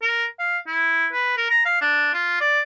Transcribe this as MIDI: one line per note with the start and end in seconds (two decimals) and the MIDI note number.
0.02 0.25 70
0.39 0.58 77
0.67 1.07 64
1.12 1.33 71
1.37 1.46 70
1.50 1.61 82
1.65 1.81 77
1.81 2.13 62
2.14 2.36 65
2.41 2.60 74